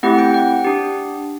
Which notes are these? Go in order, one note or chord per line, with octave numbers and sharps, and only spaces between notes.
A3 C4 E4 G4 F#5
G5
F#5
D4 G4